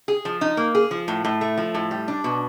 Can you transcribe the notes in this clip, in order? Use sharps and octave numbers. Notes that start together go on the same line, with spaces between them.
G#4
F3
D#4
A#3
G#4
F3
A2
A2
A3
F3
A2
G3
D4
B2